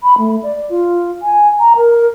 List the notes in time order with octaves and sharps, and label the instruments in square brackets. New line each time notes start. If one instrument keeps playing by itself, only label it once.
[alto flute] B5
A3
D5
F4
G#5
A#5
A#4